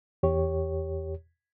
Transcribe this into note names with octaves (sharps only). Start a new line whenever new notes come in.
E2 G4 C#5